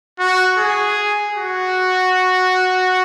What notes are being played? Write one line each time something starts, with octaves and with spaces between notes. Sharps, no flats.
F#4
G#4
F#4